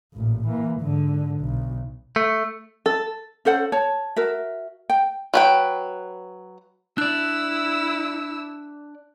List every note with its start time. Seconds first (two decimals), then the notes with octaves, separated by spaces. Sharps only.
0.14 A1 A#2
0.47 E3 A#3
0.81 G#2 D3
1.41 B1
2.16 A3
2.86 A4
3.45 C#4 A4 C5 F#5
3.72 C#5 A5
4.16 F#4 A#4 E5
4.90 G5
5.34 F#3 B4 G5
6.98 D4 E4 D5 E6 F#6